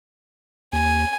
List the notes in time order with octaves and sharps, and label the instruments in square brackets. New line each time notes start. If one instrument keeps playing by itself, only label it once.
[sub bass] D#2 [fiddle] G#5